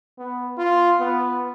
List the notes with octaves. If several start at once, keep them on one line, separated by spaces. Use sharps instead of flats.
B3
F4
B3